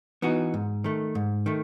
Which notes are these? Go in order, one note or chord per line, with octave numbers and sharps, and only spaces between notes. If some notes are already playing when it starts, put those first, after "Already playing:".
E3 B3 D#4 F#4
G#2
D#3 A3
G#2
D#3 A3